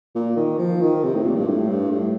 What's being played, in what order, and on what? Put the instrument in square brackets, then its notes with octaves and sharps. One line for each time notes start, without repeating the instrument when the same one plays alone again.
[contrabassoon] A#2
D#3
F3
D#3
C3
A2
A#2
G2
A2
G2
A2